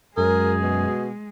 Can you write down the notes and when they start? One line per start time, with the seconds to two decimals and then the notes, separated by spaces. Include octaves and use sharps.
0.17 F#2 G#3 G#4 A#4
0.62 B2